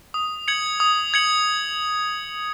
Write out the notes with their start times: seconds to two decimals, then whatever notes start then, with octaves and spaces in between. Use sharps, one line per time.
0.14 D#6
0.48 G#6 C#7 F#7
0.80 D#6
1.14 G#6 C#7 F#7